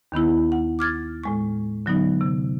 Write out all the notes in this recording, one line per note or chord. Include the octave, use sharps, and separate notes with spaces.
D#2 D#3 B3 E4
F#5
D6 F6 G#6 A6
A2 G#3 C#6
D3 F#3 B3 D#4
C3